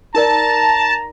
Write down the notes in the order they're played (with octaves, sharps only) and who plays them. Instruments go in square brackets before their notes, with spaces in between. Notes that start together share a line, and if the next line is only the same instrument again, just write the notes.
[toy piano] D#4 A#4 D5 [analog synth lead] A5 [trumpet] A#5